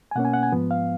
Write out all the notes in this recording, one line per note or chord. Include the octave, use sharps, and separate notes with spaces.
G#5
B2 A#3 C#4 F#5
G#5
F#5
G#5
G#2 F3 B3
F5